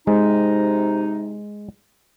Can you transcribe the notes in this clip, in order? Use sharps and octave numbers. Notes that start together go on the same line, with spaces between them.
C3 G#3 D#4